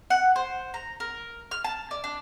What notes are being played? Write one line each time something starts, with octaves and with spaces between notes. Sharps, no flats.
F#5
C5
A#5
A#4
F6
A5
D5
D4